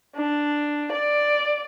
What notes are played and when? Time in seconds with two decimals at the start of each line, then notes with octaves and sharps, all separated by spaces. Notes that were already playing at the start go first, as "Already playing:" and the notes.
0.16 D4
0.92 D5